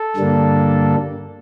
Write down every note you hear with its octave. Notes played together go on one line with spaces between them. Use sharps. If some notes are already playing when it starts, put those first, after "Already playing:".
Already playing: A4
G2 D3 G3 A#3 D4